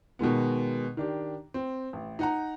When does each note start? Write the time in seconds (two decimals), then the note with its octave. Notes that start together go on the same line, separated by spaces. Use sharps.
0.19 B2 D#3 G#3 B3
0.97 D#3 D4 G4
1.54 C4
1.93 A1
2.19 D#4 F#5 A#5